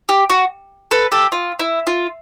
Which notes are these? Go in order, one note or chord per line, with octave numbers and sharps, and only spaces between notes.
G4
F#4
A4 B4
G4 A4
F4
E4
F4